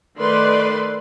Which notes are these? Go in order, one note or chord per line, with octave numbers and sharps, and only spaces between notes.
D#3 A3 B4 D5 C6